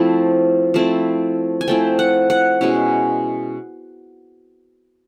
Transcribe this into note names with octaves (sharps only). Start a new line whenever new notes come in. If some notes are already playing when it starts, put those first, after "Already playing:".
Already playing: F3 A3 C4 E4
F3 A3 C4 E4
G#5
F3 A3 C4 E4 G5
F#5
F#5
B2 G#3 C#4 E4